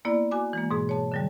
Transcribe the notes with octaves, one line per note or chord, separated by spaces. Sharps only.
A#3 B3 E4 D5
F#4 G#5 D6
E3 G#3 A#3
G#2 B2 G#4
C#5 A5
D3 F#3 G3